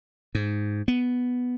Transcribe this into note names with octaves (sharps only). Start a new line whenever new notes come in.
G#2
B3